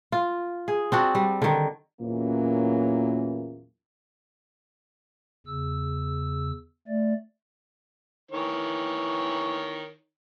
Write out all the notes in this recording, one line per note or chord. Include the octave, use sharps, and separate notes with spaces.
F4
G#4
C4 D4 F#4
G3
D3 D#3
E2 A#2 E3 F#3 A#3 C#4
E2 C#3 E6
A3 D5
D#3 E3 C#5